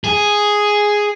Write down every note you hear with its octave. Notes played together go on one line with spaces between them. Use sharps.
G#4